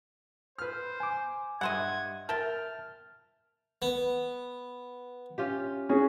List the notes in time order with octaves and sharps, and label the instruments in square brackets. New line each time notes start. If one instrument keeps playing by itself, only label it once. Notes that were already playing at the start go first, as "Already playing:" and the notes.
[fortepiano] B4 F6 [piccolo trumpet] C5
[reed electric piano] G#5 D6
[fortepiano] G2 C6 [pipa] D#5 E5 F#5 [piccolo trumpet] G#6
[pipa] A#4 E5 G5 [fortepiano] A5 [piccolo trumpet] F6 [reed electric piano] G6 A6
[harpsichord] B3
[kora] C#4 F4 G4
[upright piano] C#4 G#4 [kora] F#4